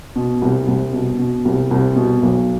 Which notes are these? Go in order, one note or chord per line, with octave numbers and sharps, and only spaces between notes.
B2
C2
C2
B2
B2
C2
C2
B2
B1